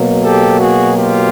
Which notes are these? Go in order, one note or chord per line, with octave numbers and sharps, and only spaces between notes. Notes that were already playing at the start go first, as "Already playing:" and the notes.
Already playing: B2 F#3 A#3
G4 A4
F#4 G#4
F4 G4